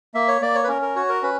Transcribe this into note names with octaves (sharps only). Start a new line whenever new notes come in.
A#3 E5
C#5
A#3 D5
C#5
B4
C#4 A#4
A#4
F#4 C#5
A#4
C#4 B4